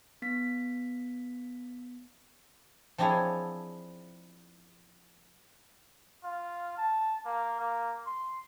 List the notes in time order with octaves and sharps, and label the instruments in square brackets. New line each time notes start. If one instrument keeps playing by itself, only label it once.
[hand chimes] B3 B6
[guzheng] F3 C4 D4 E4 G#4 C#5
[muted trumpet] F4
A5
A#3
A#3
C6